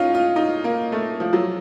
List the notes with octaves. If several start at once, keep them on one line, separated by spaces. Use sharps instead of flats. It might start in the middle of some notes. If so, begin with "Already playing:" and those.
Already playing: C#4 D#4 F4
F4
D#4
A#3
A3
F3
F#3